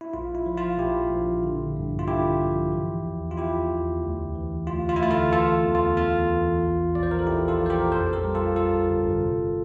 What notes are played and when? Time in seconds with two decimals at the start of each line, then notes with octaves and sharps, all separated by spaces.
0.01 E4
0.14 A#1 F4
0.35 E4
0.46 F3
0.57 F4
0.78 A#1 E4 G4
1.11 A#1
1.43 D3
1.76 G2
1.99 F4
2.08 D3 E4 G4
2.41 F3
2.72 E3
3.05 E2
3.31 F4
3.37 E2 E4 G4
3.70 E2
4.03 D2
4.35 E3
4.67 D2 F4
4.89 F4
4.96 E4
5.00 D2 F4
5.11 F4 A4
5.32 E3 F4 A4
5.65 E2
5.75 F4
5.97 E2 F4
6.29 E3
6.62 A#1
6.95 A#1 D5
7.03 C5
7.11 A#4
7.19 A4
7.27 A#1 E4 G4
7.48 F4 A4
7.59 A#1
7.66 C5
7.70 G4 A#4
7.91 F2 A4 C5
8.13 G4 A#4
8.24 G3
8.35 F4 A4
8.56 G1 F4 A4
8.89 G1
9.21 C3